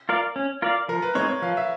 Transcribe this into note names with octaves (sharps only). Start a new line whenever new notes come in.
F4 A#4 D5 F5
C#4
F4 A#4 D5 F5
F3 A#4
B4
G#3 C4 D#4 C#5
C#5
F3 F5
E5